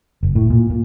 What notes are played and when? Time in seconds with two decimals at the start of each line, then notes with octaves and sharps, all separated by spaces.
0.23 F#1
0.35 A2
0.50 A#2
0.70 A#2